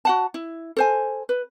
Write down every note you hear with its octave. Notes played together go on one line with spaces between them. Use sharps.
F#4 F#5 A5
E4
A4 C5 G#5
B4